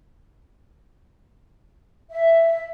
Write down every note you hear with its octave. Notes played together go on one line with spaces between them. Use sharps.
E5